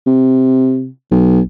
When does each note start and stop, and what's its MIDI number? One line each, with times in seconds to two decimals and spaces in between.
0.07 0.88 48
1.11 1.40 35